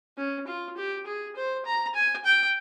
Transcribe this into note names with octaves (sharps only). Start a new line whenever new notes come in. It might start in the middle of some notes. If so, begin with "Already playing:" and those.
C#4
F4
G4
G#4
C5
A#5
G#5
G5